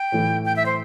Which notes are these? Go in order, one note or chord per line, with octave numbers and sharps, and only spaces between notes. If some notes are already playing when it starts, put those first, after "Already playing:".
Already playing: G5
A2 E3 A3
G5
E5
C5